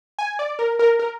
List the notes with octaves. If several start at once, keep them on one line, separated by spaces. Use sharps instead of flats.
G#5
D5
A#4
A#4
A#4